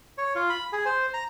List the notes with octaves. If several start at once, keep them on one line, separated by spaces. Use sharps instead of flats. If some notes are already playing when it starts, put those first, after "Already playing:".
C#5
F4
B5
G#4
C5
A#5